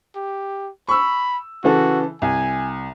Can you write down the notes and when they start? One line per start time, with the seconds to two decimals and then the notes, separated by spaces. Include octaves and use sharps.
0.16 G4
0.89 B5 C#6 E6
1.64 C#3 E3 F#4 A4
2.22 C2 G#5